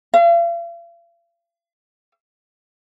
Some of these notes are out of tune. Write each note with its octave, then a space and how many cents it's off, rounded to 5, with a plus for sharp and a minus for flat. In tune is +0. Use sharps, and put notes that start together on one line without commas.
F5 -45